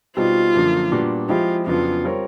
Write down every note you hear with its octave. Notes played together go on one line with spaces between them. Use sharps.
B2 G3 C4 D#4 F4
F#2 D3 F3 A#3
A#2 G3 B3 D4 F#4
F3 G#3 C4 E4 F4 G4
F2 C#3 F#3 B3 D4 F4
G3 C4 F4 A#4 C#5